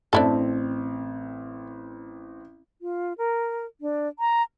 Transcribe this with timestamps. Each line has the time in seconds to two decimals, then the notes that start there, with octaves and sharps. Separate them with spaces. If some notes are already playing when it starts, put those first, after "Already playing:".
0.13 A1 C4 D4 E4 A4
2.82 F4
3.18 A#4
3.81 D4
4.19 A#5